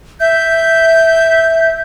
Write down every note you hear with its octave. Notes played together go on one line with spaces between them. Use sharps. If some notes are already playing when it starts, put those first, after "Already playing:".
E5 G6